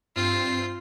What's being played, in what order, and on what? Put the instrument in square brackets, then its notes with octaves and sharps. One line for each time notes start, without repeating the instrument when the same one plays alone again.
[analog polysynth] G2 C4 C7 [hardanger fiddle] F4